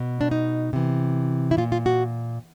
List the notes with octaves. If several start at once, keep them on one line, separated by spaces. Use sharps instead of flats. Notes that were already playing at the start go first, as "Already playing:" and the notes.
Already playing: B2
D4
D#4
C3 E3
E4
A#2 F4
F4
F#4